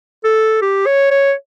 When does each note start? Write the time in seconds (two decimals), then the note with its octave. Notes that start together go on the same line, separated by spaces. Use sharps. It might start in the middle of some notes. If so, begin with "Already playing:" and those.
0.25 A4
0.62 G4
0.86 C#5
1.11 C#5